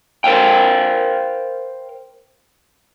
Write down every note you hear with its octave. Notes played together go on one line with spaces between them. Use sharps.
A#4 C5 D5 F5 G5